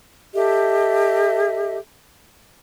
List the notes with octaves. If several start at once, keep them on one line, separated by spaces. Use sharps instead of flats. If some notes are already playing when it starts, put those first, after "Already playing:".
G4 A4 D#5 E5